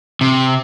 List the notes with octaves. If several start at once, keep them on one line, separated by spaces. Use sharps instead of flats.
C3